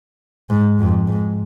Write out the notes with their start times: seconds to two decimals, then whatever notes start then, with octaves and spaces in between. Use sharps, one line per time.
0.50 G#2
0.79 F2
1.08 G#2